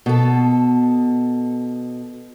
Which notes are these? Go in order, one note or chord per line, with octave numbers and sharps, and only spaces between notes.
B2 A4